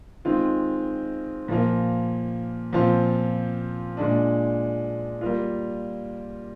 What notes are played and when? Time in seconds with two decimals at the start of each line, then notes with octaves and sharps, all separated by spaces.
0.25 D#3 G#3 C4 F4
1.48 A#2 F3 A#3 F4
2.73 A#2 F3 C4 F4
3.97 A#2 G#3 D4
5.21 G3 A#3 F4